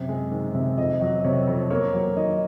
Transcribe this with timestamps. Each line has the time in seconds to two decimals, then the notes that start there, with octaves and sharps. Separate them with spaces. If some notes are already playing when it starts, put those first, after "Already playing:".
Already playing: F#2 C3
0.09 G#3
0.32 D#3
0.55 C3
0.78 F2 D#5
1.01 F#3 D#5
1.24 C3 C#5
1.47 F2 C#5
1.70 A#3 C#5
1.94 F#3
2.16 D#3 D#5